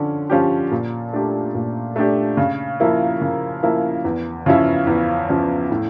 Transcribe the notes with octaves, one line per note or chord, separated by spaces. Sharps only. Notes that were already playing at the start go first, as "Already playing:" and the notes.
Already playing: D3 F3 C#4
F3 C#4 G4
A#2
A3 D4 G4
A#2
A3 D4 G4
C#3
F3 A#3 E4
C#3
F3 A#3 E4
E2
C#3 F3 C#4 E4
E2
C#3 F3 C#4 E4
A2